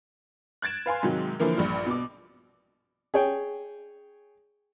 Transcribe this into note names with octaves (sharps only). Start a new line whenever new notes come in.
F#6 G#6 A6 D7 E7
B4 F5 G#5 C6
G#2 C3 D#3 F#3
D3 E3 F3 A#3 A#4
A#1 G2
B2 D6
G#4 C#5 G5